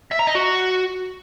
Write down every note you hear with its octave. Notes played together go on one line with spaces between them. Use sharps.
E5
A#5
D#5
F#4